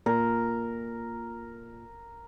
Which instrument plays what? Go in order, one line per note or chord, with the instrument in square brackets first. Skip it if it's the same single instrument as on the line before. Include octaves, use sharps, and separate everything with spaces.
[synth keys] A#2 [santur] A#4